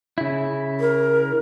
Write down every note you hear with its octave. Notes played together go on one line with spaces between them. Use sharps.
C#3 E4
A#4